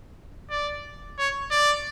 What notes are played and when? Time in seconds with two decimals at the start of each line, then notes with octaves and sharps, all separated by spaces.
0.50 D5
1.19 C#5
1.51 D5